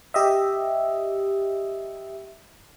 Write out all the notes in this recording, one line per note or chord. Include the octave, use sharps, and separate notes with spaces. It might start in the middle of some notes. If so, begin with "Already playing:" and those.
G4 D#5 E5